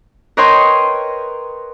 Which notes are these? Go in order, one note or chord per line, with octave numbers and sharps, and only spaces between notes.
A#4 B4 C#5 D#5 G5 C6